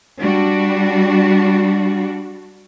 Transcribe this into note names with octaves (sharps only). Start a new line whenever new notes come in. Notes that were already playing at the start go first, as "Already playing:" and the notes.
G3 D4 F#4